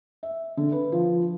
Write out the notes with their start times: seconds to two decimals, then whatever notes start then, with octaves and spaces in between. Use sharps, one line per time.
0.23 E5
0.57 D3
0.72 B4
0.92 F3